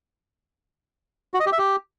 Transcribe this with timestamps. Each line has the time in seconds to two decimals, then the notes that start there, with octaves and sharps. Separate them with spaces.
1.34 F#4
1.40 D#5
1.46 G4
1.52 E5
1.59 G4